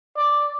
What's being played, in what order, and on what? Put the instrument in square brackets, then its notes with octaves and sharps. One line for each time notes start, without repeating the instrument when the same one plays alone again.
[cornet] D5